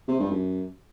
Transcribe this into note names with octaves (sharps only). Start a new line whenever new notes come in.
C3
G2
F#2